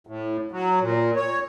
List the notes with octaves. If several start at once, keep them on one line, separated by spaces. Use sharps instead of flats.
A2
F#3
A#2
C#5